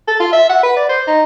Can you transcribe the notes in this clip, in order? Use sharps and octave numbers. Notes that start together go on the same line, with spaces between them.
A4
F4
E5
F#5
B4
D5
C5
D#4